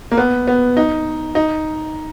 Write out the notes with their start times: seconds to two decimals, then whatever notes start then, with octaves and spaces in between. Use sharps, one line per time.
0.11 A#3
0.17 B3
0.47 B3
0.77 D#4
1.35 D#4